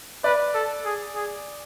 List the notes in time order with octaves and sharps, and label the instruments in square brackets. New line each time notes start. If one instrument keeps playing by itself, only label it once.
[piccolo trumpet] B4 [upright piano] D5
[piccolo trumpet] A4
G#4
G#4